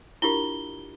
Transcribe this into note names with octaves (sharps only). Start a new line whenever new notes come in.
D4 E4 F4 G4 A#4 G7